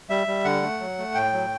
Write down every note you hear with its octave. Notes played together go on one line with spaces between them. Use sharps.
G3 E5
G3
D3 F#5
A3
F#3
A3
A2 G5
F#3